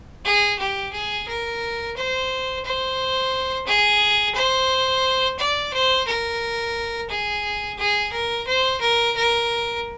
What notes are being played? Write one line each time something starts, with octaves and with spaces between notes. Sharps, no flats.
G#4
G4
G#4
A#4
C5
C5
G#4
C5
D5
C5
A#4
G#4
G#4
A#4
C5
A#4
A#4